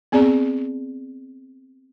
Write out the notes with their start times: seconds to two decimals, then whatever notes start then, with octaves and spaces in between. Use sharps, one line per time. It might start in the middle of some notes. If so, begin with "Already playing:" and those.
0.12 B3 C4 G#4 D5 A#5